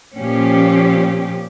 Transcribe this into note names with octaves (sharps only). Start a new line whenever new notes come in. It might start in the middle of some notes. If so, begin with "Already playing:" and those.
A#2 F3 C#4 G4